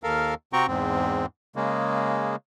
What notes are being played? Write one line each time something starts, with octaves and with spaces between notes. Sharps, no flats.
D#2 A4 A#4 F5
C3 C4 F#4 G5 A#5 C#6
E2 G#2 C4
C#3 G#3 A#3